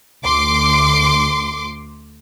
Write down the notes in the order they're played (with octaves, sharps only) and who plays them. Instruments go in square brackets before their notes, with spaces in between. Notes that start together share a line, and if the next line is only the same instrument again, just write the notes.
[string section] D2 C6 D6